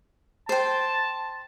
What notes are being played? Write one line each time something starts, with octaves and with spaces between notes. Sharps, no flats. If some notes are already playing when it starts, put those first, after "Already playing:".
C5 G5 A5